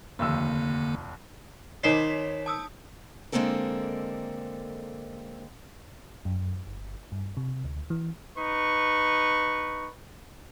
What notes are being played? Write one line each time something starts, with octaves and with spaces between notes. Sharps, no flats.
F1 D#2 D3 A#3 E6
D#3 D#4 C5 C#5 B6
A5 D#6 E6
D3 G#3 A#3 C4 A4 A#4
F#2
G1
G2
C3
D2
E3
D#4 B4 C#6